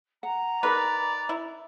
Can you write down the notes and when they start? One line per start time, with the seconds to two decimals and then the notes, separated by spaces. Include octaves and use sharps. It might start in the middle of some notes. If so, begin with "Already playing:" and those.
0.23 F#5 A#5
0.63 D#4 A#4 B4 D5 B5
1.29 E4